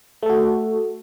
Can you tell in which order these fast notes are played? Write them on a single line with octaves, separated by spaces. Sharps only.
A3 A4 F#4